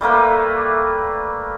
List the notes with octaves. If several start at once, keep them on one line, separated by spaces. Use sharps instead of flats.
G3 A3 A#3 B4